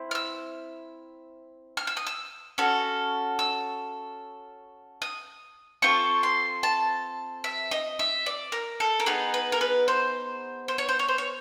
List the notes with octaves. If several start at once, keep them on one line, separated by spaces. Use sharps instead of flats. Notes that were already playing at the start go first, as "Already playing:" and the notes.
Already playing: C4 E4
F6
E6
F6
E6
D#6
E6
C#4 F#4 A4
E6
D#6
C4 F4 A4 C#6
C6
A5
E5
D#5
E5
D5
A#4
A4
A#4
B3 D#4 G#4 B4
B4
A#4
B4
C5
C5
C#5
C5
C#5
C5
C#5